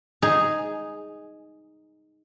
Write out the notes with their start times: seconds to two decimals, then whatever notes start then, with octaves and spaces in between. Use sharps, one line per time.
0.22 D#4 G#4